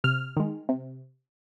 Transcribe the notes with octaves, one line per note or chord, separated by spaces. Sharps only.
C3 F6
D#3 G#3
C3